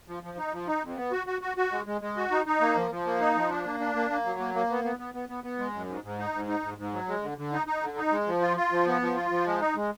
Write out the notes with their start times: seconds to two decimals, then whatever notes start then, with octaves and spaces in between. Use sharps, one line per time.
0.08 F3
0.23 F3
0.38 D#4
0.53 F3
0.68 D#4
0.83 F2
0.97 B3
1.12 F#4
1.27 F#4
1.42 F#4
1.57 F#4
1.72 G#3
1.86 G#3
2.01 G#3
2.17 F#4
2.31 D#4
2.46 D#4
2.61 A#3
2.76 F3
2.91 F3
3.06 A#3
3.20 D#4
3.36 F3
3.50 D4
3.65 A#3
3.80 D4
3.95 A#3
4.10 A#3
4.25 F#3
4.39 A#3
4.55 A#3
4.70 B3
4.84 B3
4.99 B3
5.14 B3
5.29 B3
5.44 B3
5.59 G#3
5.73 F#2
5.88 G#2
6.04 G#2
6.19 D#4
6.34 G#2
6.48 D#4
6.63 G#2
6.78 G#2
6.93 F#3
7.08 G#3
7.22 D3
7.38 D3
7.52 D#4
7.67 D#4
7.82 D3
7.97 D#4
8.12 G#3
8.27 F3
8.41 F4
8.57 F4
8.72 F3
8.87 B3
9.01 F3
9.16 F4
9.30 F3
9.46 G#3
9.61 D#4
9.76 G#3